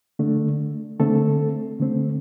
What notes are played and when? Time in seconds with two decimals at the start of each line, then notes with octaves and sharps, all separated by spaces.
0.19 D3 A3 D4
1.00 D3 A3 C4 A4
1.80 D3 A3 C4